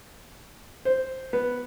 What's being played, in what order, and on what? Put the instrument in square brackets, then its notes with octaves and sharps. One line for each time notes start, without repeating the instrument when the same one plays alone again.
[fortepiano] C5
B3